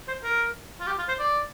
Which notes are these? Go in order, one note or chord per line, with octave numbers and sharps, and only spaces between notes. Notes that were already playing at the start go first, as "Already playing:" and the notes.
C5
A#4
F4
G4
F4
C5
D5